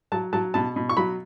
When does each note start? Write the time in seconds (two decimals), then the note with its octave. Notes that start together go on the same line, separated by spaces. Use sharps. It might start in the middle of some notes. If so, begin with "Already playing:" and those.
0.12 F#3 A5
0.33 F#3 A5
0.54 B2 A5
0.76 B2
0.89 C#6
0.97 F#3 B5